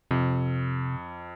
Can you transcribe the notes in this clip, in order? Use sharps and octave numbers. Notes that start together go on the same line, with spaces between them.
F2 C3